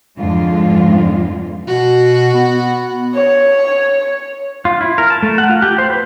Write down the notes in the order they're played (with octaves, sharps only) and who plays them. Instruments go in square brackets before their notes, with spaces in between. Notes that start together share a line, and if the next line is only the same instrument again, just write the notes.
[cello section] F2 G#2 D3 G#3 F4
[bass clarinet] B2 [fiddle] F#4
[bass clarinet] B3
[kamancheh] C#5
[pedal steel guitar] F4
E4
A#4
A5
A3
F#5
F4
G4
C5
B4